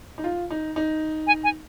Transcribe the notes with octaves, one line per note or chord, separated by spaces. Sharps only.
D#4
F4
D#4
D#4
G#5
G#5